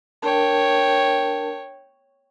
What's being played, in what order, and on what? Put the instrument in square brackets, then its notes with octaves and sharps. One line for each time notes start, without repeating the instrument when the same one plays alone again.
[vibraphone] D4 A#4 A5 [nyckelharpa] C#5 G5